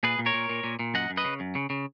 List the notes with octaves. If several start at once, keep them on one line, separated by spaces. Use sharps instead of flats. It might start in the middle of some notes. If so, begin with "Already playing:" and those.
A#2 G#4 B4
A#2
A#4 C#5
A#2
A#2
A#2
A#2
F#2 D#5 F#5
F#2
B4 D#5
C#3
F#2
C#3
C#3